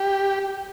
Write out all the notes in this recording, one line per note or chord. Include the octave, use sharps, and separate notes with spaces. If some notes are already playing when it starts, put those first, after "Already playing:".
Already playing: G4